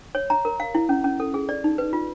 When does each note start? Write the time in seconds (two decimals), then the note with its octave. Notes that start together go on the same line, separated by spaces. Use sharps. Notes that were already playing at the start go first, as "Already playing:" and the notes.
0.15 C#5
0.30 A#5
0.45 A#4
0.60 F5
0.75 E4
0.89 C#4
1.04 C#4
1.20 A4
1.34 G#4
1.49 D5
1.64 D#4
1.78 B4
1.93 F4